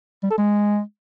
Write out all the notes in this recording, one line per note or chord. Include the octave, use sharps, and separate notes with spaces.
G3
A4
G#3